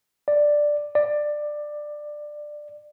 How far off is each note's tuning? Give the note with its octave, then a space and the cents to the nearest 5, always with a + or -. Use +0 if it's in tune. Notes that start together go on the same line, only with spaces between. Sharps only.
D5 +5
D5 +15